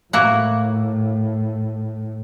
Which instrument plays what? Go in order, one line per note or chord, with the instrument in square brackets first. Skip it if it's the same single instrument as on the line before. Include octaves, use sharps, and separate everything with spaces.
[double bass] A2 [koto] A#3 E4 F#4